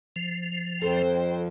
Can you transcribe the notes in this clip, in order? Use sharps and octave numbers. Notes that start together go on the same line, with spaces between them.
F3
F2 A4 C5 G5